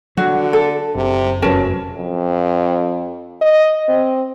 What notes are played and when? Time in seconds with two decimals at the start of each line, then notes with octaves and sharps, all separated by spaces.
0.17 D3 F#3 F#4
0.53 A4
0.95 F#1 C3
1.42 F1 F#3 C#4 A#4 B4 A5
1.97 F2
3.41 D#5
3.88 C4